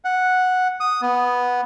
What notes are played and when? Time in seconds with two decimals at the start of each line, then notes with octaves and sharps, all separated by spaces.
0.04 F#5
0.80 D#6
1.02 B3